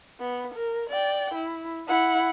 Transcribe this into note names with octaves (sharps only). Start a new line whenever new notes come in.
B3
A#4
D5 G5
E4
E4 F#5